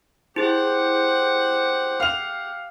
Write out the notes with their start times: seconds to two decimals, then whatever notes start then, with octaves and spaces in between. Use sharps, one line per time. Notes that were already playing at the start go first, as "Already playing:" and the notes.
0.36 E4 G4 G#4 C5 F#5
2.00 F5 F7